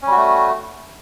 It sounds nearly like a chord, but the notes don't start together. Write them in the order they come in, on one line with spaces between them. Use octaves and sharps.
C#4 G3 F#4 A3